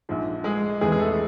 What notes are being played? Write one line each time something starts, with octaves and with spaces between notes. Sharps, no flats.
A#1 G#2 F3
G#3 G#4
E1 E2 C3 E3 G#3 G#4
G#4
A3 A4